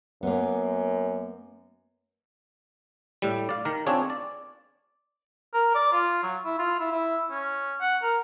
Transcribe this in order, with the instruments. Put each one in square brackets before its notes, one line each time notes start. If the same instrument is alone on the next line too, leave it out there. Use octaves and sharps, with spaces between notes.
[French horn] F#2 [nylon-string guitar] A#3 B3
[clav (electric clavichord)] A2 G3
D5 F5
D#3 A#4
C4 D4 F4 G#4 C#5
D5
[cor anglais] A#4
D5
F4
F#3
E4
F4
E4
E4
C#4
F#5
A#4